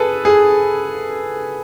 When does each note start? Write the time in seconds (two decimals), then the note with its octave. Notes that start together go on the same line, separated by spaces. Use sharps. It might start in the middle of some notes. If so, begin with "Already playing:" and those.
Already playing: G#4 A4 B4
0.25 G#4